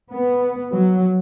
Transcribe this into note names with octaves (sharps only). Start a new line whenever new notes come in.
B3
F#3